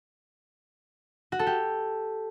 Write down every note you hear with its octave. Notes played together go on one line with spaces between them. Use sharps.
F#4
A4
G4